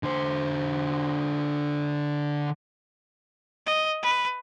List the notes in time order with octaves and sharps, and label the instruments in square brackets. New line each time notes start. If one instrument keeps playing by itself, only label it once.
[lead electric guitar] D3 C5
[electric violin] D#5
B4